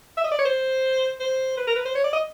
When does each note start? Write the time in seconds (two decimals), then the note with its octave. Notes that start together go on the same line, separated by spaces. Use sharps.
0.17 E5
0.24 D#5
0.32 D5
0.39 C#5
0.45 C5
1.20 C5
1.57 B4
1.67 A#4
1.76 B4
1.85 C5
1.95 C#5
2.04 D5
2.13 D#5